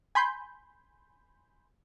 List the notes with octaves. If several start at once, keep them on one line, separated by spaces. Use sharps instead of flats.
G#5 B5 C6 G6